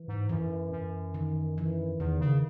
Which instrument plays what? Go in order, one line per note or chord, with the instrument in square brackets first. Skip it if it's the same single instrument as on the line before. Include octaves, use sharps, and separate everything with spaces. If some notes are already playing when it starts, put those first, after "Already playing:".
Already playing: [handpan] E3
[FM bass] G#2
[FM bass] F#2 [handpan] E3
[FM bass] F#2
[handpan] D#3
E3
[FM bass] E2 [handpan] D#3
[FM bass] C#3